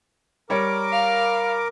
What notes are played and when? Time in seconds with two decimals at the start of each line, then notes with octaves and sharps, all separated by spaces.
0.50 G3 A#4 C#5 D6
0.92 F5